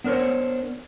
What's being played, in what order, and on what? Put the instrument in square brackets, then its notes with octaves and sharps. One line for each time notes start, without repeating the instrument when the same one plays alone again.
[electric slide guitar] B3 D4 A#4 C5 C#5